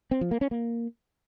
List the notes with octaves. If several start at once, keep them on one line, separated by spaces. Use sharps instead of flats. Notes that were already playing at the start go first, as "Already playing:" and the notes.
C4
F3
A#3
C#4
A#3